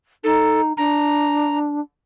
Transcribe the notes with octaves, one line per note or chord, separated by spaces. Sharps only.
D#4 A4
D4 A#5